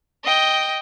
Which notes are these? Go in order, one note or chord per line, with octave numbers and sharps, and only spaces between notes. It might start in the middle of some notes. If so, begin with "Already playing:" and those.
D#5 G5